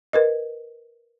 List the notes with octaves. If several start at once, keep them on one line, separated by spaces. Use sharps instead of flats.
A#4 B4 D#5